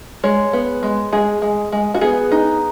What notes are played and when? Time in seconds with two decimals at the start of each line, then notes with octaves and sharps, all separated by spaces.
0.24 G#3 C#5
0.53 B3
0.83 G#3
1.13 G#3 G#4
1.42 G#3
1.72 G#3
1.94 F#4
2.01 B3 G#4
2.32 D#4